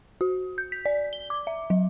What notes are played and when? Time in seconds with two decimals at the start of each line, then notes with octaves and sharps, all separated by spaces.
0.21 F#4
0.58 G6
0.72 B6
0.86 D5
1.13 G7
1.30 D6
1.47 E5
1.70 F#3